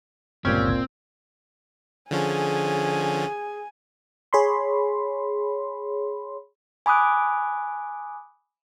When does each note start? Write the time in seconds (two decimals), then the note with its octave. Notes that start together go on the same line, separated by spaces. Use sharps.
0.45 G1 C#2 A#2 C4 C#4 G4 G#6
2.11 D3 F3 C#4 G#4 G#5
4.33 G#4 C#5 B5 C6
6.86 G#5 B5 D6 D#6 F#6